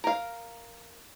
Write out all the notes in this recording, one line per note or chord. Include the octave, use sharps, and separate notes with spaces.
A#4 F5